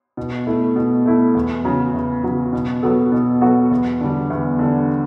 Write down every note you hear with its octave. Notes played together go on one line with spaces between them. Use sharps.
B2
A3 E4
B2
A3 E4
E2
C#3 F#3
E2
C#3 F#3
B2
F#3 B3 F#4 A4
B2
F#3 B3 F#4 A4
E2
D3 G3
E2
D3 G3